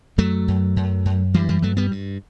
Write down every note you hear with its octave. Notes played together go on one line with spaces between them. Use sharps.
F#2 F#3 A3
F#2
F#2
F#2
G2 E3 G3
E3 G3
G2 F#3 A3
G3 B3
G2